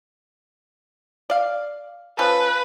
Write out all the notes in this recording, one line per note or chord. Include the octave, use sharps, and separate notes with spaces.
D5 F5
F3 C#4 A4 B4